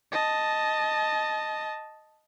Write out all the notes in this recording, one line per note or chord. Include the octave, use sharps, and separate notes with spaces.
D#5 A5